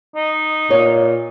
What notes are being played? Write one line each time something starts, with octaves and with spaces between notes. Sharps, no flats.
D#4
A#2 C#5